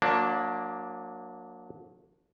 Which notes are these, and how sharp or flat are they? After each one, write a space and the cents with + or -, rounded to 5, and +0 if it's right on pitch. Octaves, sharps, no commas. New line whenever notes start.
F#3 -30 A#3 +0 D4 +0